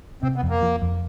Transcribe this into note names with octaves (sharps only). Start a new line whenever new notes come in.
C3 C4
B3
F2
A#3
F3
F2